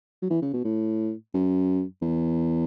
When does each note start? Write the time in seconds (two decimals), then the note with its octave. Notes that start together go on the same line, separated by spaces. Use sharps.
0.22 F#3
0.30 E3
0.42 C#3
0.54 B2
0.64 A2
1.34 F#2
2.02 E2